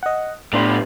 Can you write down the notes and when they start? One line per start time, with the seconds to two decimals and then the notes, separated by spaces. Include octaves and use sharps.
0.03 D#5 F#5
0.53 A2 G3 B3 D4 C6